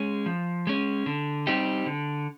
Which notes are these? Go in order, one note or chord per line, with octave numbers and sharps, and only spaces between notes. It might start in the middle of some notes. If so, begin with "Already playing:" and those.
Already playing: G#3 C#4
F3
G#3 C#4
D3
G3 C4 D#4 G4
D3